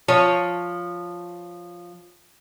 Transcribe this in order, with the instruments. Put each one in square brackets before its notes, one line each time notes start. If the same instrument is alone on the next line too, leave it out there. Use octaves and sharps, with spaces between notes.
[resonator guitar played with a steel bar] F3 C#5